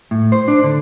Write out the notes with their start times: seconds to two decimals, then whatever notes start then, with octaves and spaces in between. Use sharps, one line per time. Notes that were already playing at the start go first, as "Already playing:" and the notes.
0.11 A2
0.32 C5
0.48 D4
0.64 D3